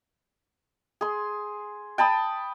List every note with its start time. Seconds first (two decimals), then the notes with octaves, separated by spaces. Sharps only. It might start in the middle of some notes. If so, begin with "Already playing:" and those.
1.01 G#4 C6
1.98 G5 A5 B5 D#6